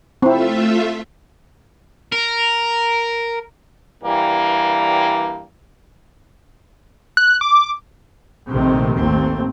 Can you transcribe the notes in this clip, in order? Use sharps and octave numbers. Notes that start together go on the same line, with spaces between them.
A3 C4 E4 F4 E5
A#4
G2 E3 G3 A#3
F#6
D6
A#1 C3 D#3 A3 C4
A1 D#2 A3 C4